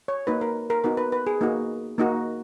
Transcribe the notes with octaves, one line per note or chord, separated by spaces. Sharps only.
C#5
A#3 D#4 F#4 B4
A#4
A#4
B3 D#4 F#4 A#4
B4
B4
G#4
A#3 D#4 F#4
A#3 D#4 F#4